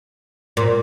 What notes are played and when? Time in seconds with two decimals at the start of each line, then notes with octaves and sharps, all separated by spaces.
0.57 A#2